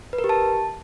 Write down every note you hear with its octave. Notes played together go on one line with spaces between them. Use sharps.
B4
A#4
G4
A5